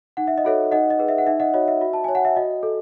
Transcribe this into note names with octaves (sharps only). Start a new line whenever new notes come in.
D#4 F#5
E5
D#5
F#4 A4 C#5 E5
D#4 D#5 F#5
D#5
G#4 B4
E5
F#5
D#4 E5
D#5 F#5
F#4 C#5 D#5
E5
F#4 E5
A5
C#5 G#5
F#5
E5
F#4 D#5
A4